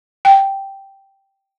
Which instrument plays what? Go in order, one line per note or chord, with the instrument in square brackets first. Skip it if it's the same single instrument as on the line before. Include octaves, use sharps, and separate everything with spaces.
[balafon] G5